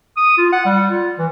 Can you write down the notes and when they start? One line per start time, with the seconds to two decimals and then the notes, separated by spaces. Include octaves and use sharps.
0.17 D#6
0.38 F4
0.52 F#5
0.66 G3
0.91 F4
1.18 E3